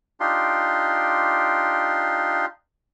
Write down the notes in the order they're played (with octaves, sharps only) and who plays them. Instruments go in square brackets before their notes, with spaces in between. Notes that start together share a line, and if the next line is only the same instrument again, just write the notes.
[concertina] D4 D#4 F4 G4 C6